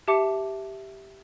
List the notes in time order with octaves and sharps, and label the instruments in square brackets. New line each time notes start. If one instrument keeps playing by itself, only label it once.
[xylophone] G4 E5 A5 D6 C#7